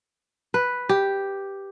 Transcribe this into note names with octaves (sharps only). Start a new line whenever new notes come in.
B4
G4